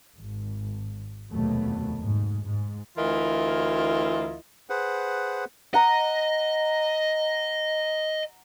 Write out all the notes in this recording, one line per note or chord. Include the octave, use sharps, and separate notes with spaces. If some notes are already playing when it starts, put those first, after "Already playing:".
G#1
F1 D#2 B2 F#3 A3
G#2
G#2
D2 E3 E4 F4 A#4 D#5
G#4 B4 C5 F#5
D#5 F#5 A#5